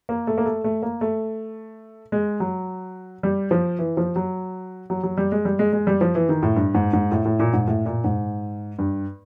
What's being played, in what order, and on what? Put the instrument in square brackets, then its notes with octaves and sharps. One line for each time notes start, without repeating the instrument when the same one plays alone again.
[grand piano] A#3
A3
A#3
A3
A3
A#3
A3
G#3
F#3
G3
F3
E3
F3
F#3
F#3
F#3
G3
G#3
G3
G#3
G#3
G3
F3
E3
D#3
A2
G2
G#2
G#2
A2
A2
A#2
G#2
A2
A#2
G#2
G2